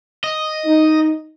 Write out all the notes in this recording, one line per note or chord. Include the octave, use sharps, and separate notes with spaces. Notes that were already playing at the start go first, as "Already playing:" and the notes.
D#5
D#4